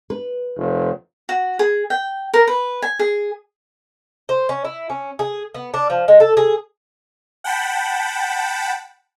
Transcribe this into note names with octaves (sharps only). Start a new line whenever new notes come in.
B4
F1
F#4
G#4
G5
A#4
B4
G#5
G#4
C5
C#4
E4
C#4
G#4
B3
D4
F3
G#3
A4
G#4
F#5 G5 A5 B5